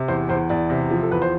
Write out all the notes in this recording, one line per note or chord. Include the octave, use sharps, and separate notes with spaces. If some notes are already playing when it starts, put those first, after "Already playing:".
Already playing: C3
E2 C5
E2 C5
E2 D5
C3
F3
A4
E2 B4
C5